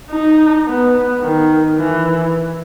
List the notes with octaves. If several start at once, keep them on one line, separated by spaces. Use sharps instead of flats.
D#4
B3
D#3
E3